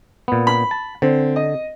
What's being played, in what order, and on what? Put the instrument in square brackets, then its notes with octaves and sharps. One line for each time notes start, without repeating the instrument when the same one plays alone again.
[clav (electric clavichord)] A#2 B3
[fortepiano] B5
[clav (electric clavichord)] A5
[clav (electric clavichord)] D3 [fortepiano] C4
[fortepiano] D#5